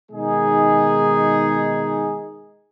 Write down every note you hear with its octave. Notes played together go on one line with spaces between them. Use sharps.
B2 D#3 G#3 D#4 G#4